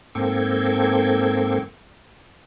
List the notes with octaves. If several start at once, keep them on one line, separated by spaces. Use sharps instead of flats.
G#2 A#3 C4 A4 G5 G#6